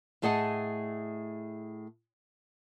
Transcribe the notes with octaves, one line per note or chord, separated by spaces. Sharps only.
A2 A3 G#4 D#5 F#5 A5